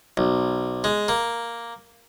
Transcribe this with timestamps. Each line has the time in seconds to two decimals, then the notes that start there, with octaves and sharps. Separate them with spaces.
0.17 B1
0.84 G#3
1.08 A#3